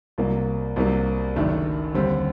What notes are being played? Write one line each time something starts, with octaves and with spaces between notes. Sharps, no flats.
C2 C3 F#3 A#3
C2 C3 F#3 A#3
F#1 F#2 D#3 A3 D4
D#2 D3 G3 C4